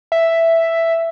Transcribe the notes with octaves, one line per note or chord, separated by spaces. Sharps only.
E5